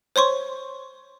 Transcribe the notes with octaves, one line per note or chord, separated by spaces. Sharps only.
C5 C#5 C6 C#6